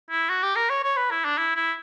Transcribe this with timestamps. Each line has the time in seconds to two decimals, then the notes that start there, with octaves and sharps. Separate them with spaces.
0.10 E4
0.29 F#4
0.43 G4
0.56 A#4
0.70 C#5
0.83 C#5
0.96 B4
1.11 E4
1.25 D4
1.38 E4
1.56 E4